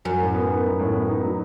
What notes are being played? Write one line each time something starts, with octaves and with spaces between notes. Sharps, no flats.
F#2 F#3
A2
B3
D#4
F#3
A2
B3
D#4
F#3